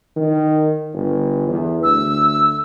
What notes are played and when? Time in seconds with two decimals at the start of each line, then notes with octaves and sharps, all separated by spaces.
0.16 D#3
0.93 G1
1.48 E2
1.83 D2 E6